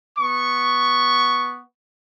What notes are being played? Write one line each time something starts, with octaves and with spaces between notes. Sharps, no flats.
B3 C#6